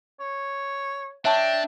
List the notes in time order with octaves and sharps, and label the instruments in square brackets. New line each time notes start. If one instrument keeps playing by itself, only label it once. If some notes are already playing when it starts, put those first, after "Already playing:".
[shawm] C#5
[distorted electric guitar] D4 [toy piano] C#5 A5 C#6 [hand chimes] E5 [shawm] G5